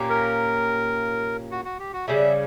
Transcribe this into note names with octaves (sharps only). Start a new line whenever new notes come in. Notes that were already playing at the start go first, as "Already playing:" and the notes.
Already playing: A#2 A#3 C#4 G4
A#4
F#4
F#4
G4
F#4
C#3 G3 C#4 E5